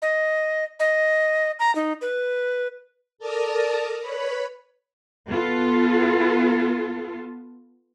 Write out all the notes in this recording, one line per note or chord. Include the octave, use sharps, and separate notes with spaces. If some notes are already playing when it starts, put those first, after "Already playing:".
D#5
D#5
A#5
D#4
B4
A4 A#4 D5 A5 A#5 D#6
B4 C#5 B5
B3 F4 A4